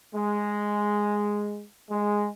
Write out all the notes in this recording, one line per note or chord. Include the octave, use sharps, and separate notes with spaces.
G#3
G#3